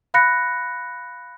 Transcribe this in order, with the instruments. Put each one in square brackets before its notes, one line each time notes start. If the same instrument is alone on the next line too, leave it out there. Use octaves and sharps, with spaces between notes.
[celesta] F5 B5 F#6 A#6 C#7